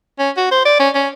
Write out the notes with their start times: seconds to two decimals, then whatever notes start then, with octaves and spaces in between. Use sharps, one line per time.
0.19 C#4
0.37 F#4
0.51 C5
0.65 D5
0.79 C#4
0.95 C#4